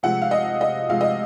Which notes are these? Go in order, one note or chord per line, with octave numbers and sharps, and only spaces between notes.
C3 F3 G#3 F#5
F5
D#5
D#5
C3 F3 G#3 F5
D#5